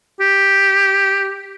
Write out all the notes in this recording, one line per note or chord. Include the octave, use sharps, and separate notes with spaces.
G4